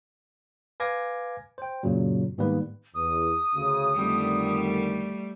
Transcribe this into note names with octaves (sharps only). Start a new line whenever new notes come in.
B4 F5 G#5 D6 G#6 A#6
C5 G5
F#2 A#2 C#3 F#3
G#2 D#3 G3 A#3 B3 B4
E2 D#6
D2 C#3
F2 D3 D#3 G3 A3